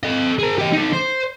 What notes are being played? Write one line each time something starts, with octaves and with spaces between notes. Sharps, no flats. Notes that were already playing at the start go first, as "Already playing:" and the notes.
A4 D#5
G#4 A#4
G4 D#5
D#4 A4
C5